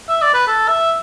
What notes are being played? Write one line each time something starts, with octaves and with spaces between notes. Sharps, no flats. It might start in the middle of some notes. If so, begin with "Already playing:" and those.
E5
D5
B4
A4
E5